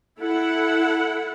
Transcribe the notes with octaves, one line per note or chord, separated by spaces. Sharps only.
E4 A4 F#5